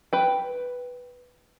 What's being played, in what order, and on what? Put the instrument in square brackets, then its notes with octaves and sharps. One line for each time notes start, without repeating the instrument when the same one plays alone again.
[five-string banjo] B4 G5